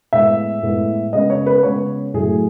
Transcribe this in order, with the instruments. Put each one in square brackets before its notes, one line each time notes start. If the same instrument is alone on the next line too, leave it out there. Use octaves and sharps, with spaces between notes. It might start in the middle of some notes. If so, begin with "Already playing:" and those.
[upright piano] A2 G#3 B3 E5
A2 G#3 B3
C#3 G#3 B3 D#5
C#5
B4
C#3 G#3 B3 C#5
A2 F#3 A3 G#4